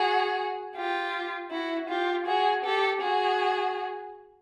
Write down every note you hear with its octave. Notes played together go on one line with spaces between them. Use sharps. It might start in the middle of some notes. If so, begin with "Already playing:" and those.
Already playing: F#4 G#4
F4 G4
E4 F#4
F4 G4
F#4 G#4
G4 A4
F#4 G#4